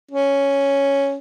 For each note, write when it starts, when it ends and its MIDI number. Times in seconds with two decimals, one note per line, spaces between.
0.11 1.17 61